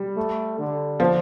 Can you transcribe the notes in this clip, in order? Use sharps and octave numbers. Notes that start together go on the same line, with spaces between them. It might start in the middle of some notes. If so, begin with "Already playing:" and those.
Already playing: G3
A3
D3
F3